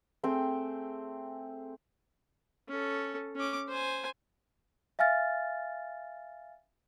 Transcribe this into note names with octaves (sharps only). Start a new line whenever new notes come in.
A3 C4 G#4 G5
C#4 A4
C#4 D6
C5 G#5
E5 F5 G#5 F6 A6